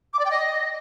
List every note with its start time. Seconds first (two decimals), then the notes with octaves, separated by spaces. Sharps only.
0.13 D6
0.19 D5
0.25 G5
0.30 D#5